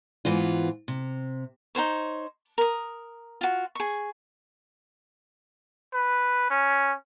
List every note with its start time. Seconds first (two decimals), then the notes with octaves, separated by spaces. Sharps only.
0.25 G#2 E3 B3 F4
0.88 C3
1.75 D#4 F#4 C5 C#5
2.58 A#4 D#6
3.41 F4 F#4
3.75 G#4 C#6
5.93 B4
6.50 C#4